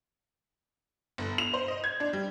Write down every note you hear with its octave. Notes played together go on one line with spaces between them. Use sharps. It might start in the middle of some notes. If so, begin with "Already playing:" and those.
G1
F7
C5
D#5
G#6
D4
G3